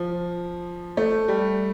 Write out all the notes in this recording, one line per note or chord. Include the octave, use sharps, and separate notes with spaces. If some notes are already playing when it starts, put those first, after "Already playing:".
Already playing: F3
A3
G3